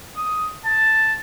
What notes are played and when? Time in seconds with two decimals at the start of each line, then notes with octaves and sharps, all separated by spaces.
0.17 D#6
0.66 A5